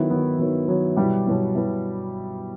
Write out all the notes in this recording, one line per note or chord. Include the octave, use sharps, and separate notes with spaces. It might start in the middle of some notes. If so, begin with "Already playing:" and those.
Already playing: D#3 F#3 B3 E4
D#3 F#3 B3
D#3 F#3 B3
D#3 F#3 B3
B2 F#3 G3 B3 E4 G4
B2 F#3 B3 E4
B2 F#3 B3 E4